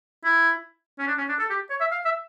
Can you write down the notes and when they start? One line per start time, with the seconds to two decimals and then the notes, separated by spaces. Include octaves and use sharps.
0.24 E4
0.99 C#4
1.07 D4
1.18 C#4
1.29 D4
1.39 A4
1.50 G4
1.70 C#5
1.80 E5
1.91 F5
2.05 E5